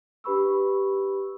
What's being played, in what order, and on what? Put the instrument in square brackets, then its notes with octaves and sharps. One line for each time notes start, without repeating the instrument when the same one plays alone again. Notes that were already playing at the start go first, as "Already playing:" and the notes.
[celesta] D4 G4 B4 B5 C#6 E6